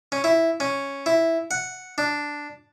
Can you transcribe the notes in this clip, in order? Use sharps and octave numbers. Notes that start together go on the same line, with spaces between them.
C#4
E4
C#4
E4
F#5
D4